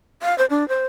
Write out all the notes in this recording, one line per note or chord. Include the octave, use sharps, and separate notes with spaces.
F5
C5
D4
C5